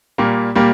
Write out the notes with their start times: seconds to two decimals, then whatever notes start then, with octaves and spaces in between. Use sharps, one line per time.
0.18 A#2 G3 A#3
0.55 A#2 G3 A#3